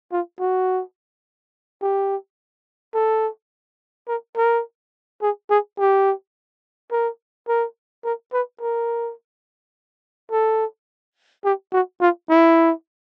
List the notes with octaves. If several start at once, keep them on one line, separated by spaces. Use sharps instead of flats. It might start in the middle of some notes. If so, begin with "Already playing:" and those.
F4
F#4
G4
A4
A#4
A#4
G#4
G#4
G4
A#4
A#4
A#4
B4
A#4
A4
G4
F#4
F4
E4